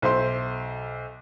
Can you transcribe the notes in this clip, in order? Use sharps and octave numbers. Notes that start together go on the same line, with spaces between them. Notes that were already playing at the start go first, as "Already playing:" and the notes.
B1 C5 E5 C6